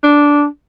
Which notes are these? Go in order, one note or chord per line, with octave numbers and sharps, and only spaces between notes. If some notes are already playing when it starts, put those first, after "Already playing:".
D4